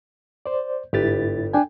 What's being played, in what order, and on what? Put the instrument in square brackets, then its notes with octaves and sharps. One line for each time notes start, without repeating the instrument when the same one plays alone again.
[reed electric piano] C5 D5
[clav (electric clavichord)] G1 G4 B4 [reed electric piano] G#2 E4 A6
[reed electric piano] D4 G5 G#5